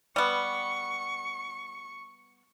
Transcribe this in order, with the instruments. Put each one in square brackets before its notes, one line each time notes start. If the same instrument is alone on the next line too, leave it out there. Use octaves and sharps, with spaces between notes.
[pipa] G3 B3 [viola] C#6